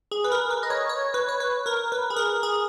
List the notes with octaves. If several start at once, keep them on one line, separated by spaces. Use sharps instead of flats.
G#4
B4
A#4
B4
D#5
C#5
C#5
B4
C#5
B4
A#4
B4
G#4
A#4
G#4